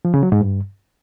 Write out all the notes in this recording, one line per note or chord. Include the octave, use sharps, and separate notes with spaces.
F3
C#3
F#3
G#2
G2